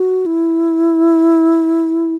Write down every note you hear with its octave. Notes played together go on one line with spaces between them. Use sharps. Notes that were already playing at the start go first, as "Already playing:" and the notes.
Already playing: F#4
E4